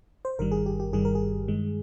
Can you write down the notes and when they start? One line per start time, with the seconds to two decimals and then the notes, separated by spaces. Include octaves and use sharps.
0.25 C5
0.38 G1 G2 D#3 G3 A#4
0.51 G#4
0.66 G4
0.80 G4
0.93 G1 G2 D#3 G3 G#4
1.05 A#4
1.15 G#4
1.48 G2 D#3 G#3